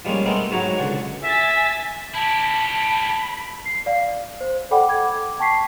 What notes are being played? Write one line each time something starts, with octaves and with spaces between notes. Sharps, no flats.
F3 G3 G#3 A#3 C#4
G#3 A3 B3 C4 A#4
G#2 F#3 C#5 F#5 A#5
C#2 D3 F#5 C#6
E5 G#5 A6 B6
E4 G4 A5 B5
C7
D5 F5
C5
A4 D5 F#5 G5 B5 D6
D6 G#6
G5 A5 C#6 B6 C7